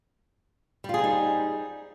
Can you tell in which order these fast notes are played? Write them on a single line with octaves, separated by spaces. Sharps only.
G3 F4 G#4 C4 D#4